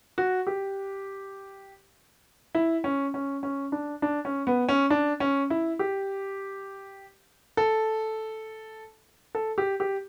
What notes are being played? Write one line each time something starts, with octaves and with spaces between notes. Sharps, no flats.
F#4
G4
E4
C#4
C#4
C#4
D4
D4
C#4
B3
C#4
D4
C#4
E4
G4
A4
A4
G4
G4